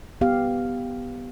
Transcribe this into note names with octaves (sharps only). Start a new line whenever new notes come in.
B3 G4 F5